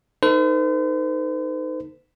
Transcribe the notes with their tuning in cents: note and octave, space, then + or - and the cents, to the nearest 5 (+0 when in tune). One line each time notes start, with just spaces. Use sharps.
D#4 +0 A4 +45 C5 -45